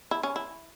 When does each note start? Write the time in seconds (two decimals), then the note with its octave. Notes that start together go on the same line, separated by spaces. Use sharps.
0.11 E4
0.23 C#4
0.36 E4